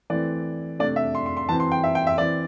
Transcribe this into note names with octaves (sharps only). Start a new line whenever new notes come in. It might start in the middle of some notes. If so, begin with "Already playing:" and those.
E3 A3 C4 D5
C3 A3 D4 D5
E5
C6
C6
C6
E3 C4 A5
C6
G5
E5
G5
E5
E3 C4 D5